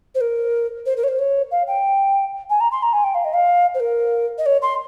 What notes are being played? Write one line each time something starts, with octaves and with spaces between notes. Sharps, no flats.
C5
A#4
C5
A#4
C#5
C5
C#5
F5
G5
G#5
A#5
C6
A#5
G#5
G5
F5
D#5
F5
C5
A#4
D#5
C#5
C6